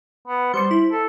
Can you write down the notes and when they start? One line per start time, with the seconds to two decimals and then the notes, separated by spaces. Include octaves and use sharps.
0.28 B3
0.54 G3 C5 C#7
0.71 E4
0.92 A4